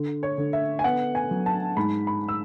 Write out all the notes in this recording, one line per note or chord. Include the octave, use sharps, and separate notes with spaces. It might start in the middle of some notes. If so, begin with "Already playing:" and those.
Already playing: D3
C#5
D3
E5
G#5
B3 F#5
G#5
F#3
A5
G#2 B5
B5
E6